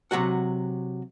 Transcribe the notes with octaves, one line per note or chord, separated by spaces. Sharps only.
C3 D#3 F#3 F#4 F#5